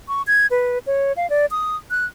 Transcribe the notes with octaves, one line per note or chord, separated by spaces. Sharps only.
C#6
G#6
B4
C#5
F5
D5
D#6
F#6